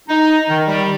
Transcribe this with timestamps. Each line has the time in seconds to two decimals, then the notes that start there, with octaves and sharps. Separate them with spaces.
0.08 D#4
0.48 D#3
0.66 G3